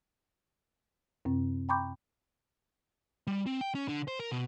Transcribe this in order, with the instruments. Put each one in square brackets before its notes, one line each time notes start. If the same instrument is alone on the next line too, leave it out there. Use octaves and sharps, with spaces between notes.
[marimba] F#2 C3 C4
G5 A#5 B5 C#6 D6 G6
[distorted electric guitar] G3
C4
G5
C#4
D3
C5
A#4
B2